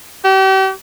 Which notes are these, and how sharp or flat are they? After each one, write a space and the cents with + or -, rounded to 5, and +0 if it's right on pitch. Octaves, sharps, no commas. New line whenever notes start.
G4 -40